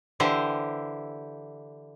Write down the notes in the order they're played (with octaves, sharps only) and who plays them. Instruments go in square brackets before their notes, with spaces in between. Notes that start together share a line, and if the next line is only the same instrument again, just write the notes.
[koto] D3 E3 G4 C5